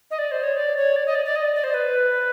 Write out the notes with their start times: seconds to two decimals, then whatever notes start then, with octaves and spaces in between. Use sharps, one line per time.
0.11 D#5
0.18 D5
0.32 C5
0.43 C#5
0.57 D5
0.77 C#5
0.96 D5
1.06 D#5
1.15 D5
1.25 D5
1.36 D#5
1.45 D5
1.55 D5
1.64 C5
1.74 B4